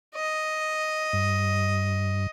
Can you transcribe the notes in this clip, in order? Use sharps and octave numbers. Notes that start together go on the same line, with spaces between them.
D#5
G2